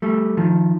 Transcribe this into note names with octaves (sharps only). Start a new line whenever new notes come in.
G3 A3
D#3 F3